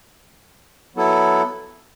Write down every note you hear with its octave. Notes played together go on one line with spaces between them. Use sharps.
F#3 B3 E4 A4